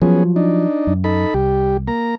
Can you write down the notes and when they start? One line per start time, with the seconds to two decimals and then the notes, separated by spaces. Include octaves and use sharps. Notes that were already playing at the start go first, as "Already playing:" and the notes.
0.02 F3 F#3 B3 C#4 G#4
0.36 D4 D#4
0.87 F#2
1.04 D#4 A4 B5
1.34 C2 G3 G4
1.88 A#3 A#5